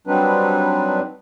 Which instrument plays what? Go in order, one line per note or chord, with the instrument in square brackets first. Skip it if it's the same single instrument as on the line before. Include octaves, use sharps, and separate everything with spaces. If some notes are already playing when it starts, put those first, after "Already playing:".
[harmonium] F#3 G3 C4 D4 D#4 B4